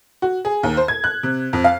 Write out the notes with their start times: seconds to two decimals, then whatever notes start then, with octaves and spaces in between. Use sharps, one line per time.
0.22 F#4
0.45 G#4
0.63 D#2
0.77 C5
0.88 G#6
1.04 F#6
1.23 C3
1.53 F2
1.64 F5